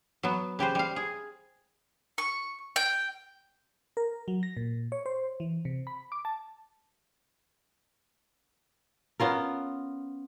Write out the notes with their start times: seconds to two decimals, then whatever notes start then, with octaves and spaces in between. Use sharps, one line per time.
0.23 F#3 B3
0.59 C#3 G4 B4 C5
0.75 G3 F5
0.96 G#4
2.18 C#6
2.76 G5
3.97 A#4
4.28 F#3
4.43 A#6
4.57 A#2
4.92 C#5
5.06 C5
5.40 E3
5.65 C3
5.87 B5
6.12 D6
6.25 A5
9.20 B3 C#4 F4 A#4